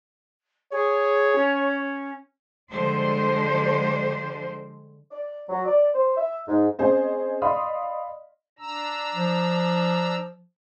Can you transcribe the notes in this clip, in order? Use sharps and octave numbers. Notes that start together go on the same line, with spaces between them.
G#4 C#5
C#4
D3 F3 G3 G#3 C5 D5
D5
F#3
D5
C5
E5
G#2
C4 C#4 G#4 C5 D#5
D5 D#5 F5 B5 C6 D#6
D4 A#5 E6
F3